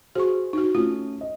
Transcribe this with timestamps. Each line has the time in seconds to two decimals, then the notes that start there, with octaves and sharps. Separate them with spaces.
0.15 F#4 G#4 C5 C#6
0.53 D#4 F#4
0.75 A3 C#4 F4
1.21 D#5